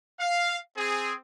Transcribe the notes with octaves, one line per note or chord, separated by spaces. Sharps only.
F5
C4 G#4